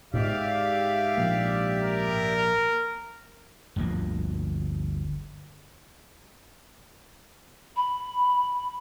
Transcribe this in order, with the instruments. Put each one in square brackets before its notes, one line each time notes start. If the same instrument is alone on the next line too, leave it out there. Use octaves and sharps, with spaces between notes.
[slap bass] G#2 [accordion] G4 D5 E5 [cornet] F5
[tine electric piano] A#1 F3 A#3
[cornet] A#4
[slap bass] G1 D2 F3 A#3
[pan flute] B5